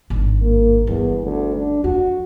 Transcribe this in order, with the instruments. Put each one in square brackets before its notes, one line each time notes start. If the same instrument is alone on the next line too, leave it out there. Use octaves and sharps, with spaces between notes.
[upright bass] G#1 G2
[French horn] A#3
[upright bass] G1 G3 [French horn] E2
[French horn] D2
D4
[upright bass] F2 [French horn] F#4